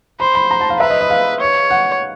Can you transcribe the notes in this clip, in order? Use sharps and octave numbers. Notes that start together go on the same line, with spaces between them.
C5 B5
B5
A#5
A5
F5
B4 E5
D#5
D#5
F5
C#5
F#5